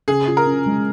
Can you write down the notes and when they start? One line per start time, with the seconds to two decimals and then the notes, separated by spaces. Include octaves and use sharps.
0.08 C#3 G#4
0.28 F4
0.37 A#4
0.47 C#4
0.66 G#3